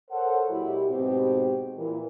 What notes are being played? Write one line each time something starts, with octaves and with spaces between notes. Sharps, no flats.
A4 A#4 C5 C#5 F#5
A#2 F#3 G#3 E4 G4
G#2 B2 C4 G4
A#2 E3